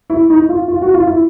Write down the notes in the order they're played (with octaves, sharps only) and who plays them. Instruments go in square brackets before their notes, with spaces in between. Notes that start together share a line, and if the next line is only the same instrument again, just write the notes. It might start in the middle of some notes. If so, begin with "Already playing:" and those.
[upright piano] E4
D#4
F4
F4
F#4
F4
E4